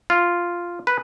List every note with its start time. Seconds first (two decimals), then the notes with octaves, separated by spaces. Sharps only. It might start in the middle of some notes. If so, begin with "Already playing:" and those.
0.10 F4
0.87 B4